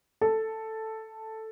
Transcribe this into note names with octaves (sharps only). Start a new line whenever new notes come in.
A4